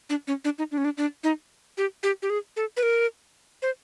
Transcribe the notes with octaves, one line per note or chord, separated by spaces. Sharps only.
D4
C#4
D4
D#4
D4
C#4
D4
D4
D#4
G4
G4
G4
G#4
A4
B4
A#4
C5